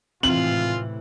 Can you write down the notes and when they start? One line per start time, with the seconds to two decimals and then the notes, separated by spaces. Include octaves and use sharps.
0.23 G#1 A2 C3 E3 C4 F4 F#7